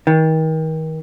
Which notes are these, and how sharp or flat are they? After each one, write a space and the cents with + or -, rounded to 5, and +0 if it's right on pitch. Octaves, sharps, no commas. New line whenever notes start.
D#3 +35